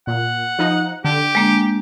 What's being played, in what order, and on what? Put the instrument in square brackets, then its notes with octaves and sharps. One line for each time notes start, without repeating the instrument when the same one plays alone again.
[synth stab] A#2 [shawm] F#5
[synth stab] F3 D#4
[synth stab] D3 [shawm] G4
[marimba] G#3 A#3 D4